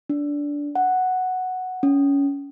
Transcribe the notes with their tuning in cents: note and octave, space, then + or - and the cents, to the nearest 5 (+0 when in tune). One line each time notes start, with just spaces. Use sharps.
D4 -15
F#5 +0
C#4 +20